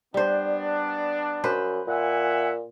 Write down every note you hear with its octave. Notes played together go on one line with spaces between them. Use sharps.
G3 B3 D4 C5
F#2 B4 C5
A#2 E5 F#5 G#5